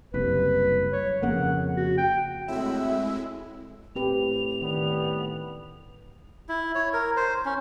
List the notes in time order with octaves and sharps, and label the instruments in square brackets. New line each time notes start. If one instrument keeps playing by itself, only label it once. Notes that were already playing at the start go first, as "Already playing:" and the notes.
[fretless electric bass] F#1 C2 [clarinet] B4
[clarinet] C#5
[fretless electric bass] F2 C#3 A#3 [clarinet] F#5
[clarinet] F#4
G5
[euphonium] A2 [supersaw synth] G#3 E4 [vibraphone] C4 [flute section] F#4 E5 E6
[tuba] A2 [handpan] C4 G4 B4 [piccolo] F7
[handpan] D#3 [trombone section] G3 B3
[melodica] E4
C#5
A#4
C5
C#4